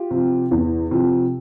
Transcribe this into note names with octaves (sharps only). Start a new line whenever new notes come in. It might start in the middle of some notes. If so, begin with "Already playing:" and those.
Already playing: F4 G4
C3 F3
E2
C3 F3